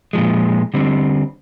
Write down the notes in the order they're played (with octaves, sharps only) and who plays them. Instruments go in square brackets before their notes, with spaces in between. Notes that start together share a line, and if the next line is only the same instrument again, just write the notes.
[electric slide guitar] A#2 F3 G#3
D3 G3 C4